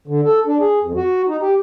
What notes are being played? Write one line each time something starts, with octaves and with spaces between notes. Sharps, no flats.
D3
A4
D4
G#4
F2
F#4
D#4
G4